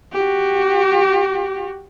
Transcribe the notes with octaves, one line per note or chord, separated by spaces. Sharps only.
F#4 G4